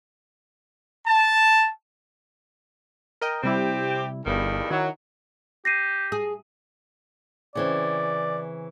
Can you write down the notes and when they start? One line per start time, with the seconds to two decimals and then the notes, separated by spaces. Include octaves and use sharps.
1.06 A5
3.21 A#4 D#5 G5
3.43 C3 G3 C4 E4 G4
4.26 G1 E2 G2 D#3
4.70 D#3 F#3 D#4 E4
5.65 G4 A#6 C7 D#7
6.12 G#4
7.55 C#3 E3 C4 D5